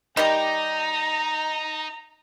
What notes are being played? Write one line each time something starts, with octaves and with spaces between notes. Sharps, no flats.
D#3 G3 D#4 G4 A#5